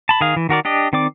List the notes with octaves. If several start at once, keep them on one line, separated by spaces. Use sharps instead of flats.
A5 B5
D#3 G#4 F5
E3
D#3 F#4 A#4 D5
D4 G4 D#5
D#3 C4 D5 D6